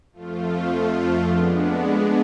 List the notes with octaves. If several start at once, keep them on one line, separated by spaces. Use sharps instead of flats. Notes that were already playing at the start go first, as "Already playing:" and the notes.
F2 F3 A3 F4
G#3 B3 D4